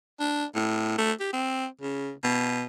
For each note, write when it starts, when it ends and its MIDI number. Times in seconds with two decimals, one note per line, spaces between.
0.20 0.45 62
0.55 0.93 45
0.98 1.12 57
1.20 1.31 67
1.33 1.66 60
1.82 2.11 49
2.24 2.65 47